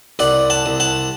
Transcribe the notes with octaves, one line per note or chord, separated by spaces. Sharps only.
C2 D5 F#5
F#5 A5
C2
F#5 A5